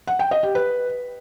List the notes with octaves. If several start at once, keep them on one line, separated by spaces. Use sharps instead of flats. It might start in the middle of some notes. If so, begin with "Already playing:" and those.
F#5
G5
D#5
G4
B4